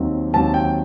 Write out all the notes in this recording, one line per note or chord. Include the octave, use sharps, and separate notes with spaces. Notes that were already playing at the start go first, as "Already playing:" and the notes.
Already playing: D#2 D#3 F#3 C4
D#2 D#3 F#3 C4 A5
G5